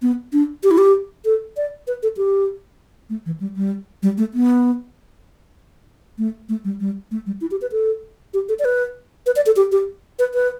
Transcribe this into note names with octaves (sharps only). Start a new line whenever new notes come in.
B3
D4
G4
E4
G4
A4
D5
B4
A4
G4
A3
E3
G3
G3
G3
A3
B3
A3
A3
G3
G3
A3
G3
E4
G4
B4
A4
G4
A4
D5
B4
B4
D5
A4
G4
G4
B4
B4